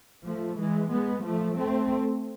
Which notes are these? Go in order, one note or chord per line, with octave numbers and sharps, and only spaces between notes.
F3 A3
E3 G#3
G#3 B3
F3 A3
A3 C4